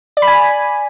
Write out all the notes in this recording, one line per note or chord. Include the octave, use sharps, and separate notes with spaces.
D5
B5
G#5